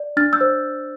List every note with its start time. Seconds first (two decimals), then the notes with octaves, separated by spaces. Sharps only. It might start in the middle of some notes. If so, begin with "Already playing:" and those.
Already playing: D5
0.17 D4 F6 A6
0.33 E6 G6
0.41 C5